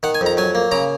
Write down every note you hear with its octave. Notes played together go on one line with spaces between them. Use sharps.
D#3 F#5
G#5
F2
A#5
F#3 G#5
A#3
C#3 A#5